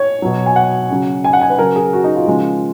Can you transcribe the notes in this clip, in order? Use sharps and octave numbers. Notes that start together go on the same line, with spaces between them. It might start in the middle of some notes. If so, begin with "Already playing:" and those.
Already playing: C#5
B2 F#3
G#5
F#5
C#3 F#3
G#5
F#5
G#5
B4
C#3 F#3 A#4
G#4
F#4
D#4
F4
C#3 F3 G#3